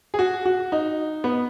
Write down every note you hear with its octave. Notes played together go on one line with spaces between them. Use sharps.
G#4
F#4
F#4
D#4
B3